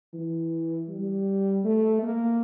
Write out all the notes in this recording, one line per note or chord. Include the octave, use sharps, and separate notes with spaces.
E3
G3
A3
A#3